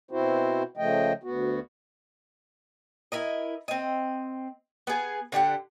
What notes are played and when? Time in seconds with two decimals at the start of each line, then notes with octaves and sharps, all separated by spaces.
0.11 B2 C4 E4 F#4 C5
0.77 C#3 F3 A3 D#5 G5
1.23 D2 B3 F#4
3.12 E4 A#4 D#5
3.68 C4 D#5
4.87 B3 G#4
5.32 D3 D4 G4 F#5